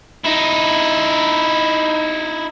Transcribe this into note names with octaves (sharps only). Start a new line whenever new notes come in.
D#4 E4